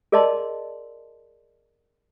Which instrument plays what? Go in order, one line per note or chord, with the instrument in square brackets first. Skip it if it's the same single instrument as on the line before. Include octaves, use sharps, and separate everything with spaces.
[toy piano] G#4 A#4 D5 D#5 A5 C6